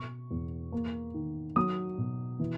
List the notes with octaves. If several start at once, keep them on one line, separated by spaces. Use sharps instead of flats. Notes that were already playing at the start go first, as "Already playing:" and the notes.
Already playing: B2 C#6
E2
A#3
D#3
F#3 D#6
B2
E3